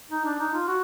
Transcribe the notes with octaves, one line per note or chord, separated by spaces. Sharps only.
D#4
D4
D#4
F4
F#4